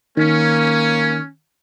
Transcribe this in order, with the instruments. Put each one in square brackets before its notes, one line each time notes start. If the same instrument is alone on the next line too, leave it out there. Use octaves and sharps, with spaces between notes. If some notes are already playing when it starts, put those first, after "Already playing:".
[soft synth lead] D#3 [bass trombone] A#3 [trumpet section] C#4